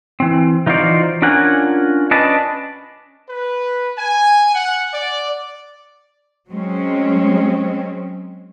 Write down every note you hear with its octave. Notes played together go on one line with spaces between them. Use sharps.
E3 C4
E3 D#4 F4 F#4 C5 D5
C#4 D4 F4 A#4 F#5 G#5
C#4 D4 B4 D#5 A5
B4
G#5
F#5
D5
F#3 G#3 C4 C#4